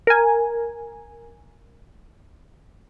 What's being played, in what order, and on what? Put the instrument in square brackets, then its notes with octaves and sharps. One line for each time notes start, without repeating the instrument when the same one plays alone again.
[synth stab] A#4 G#5